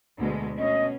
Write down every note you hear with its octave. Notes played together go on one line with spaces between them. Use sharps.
D2 B2 G#3
B2 C#4 D#5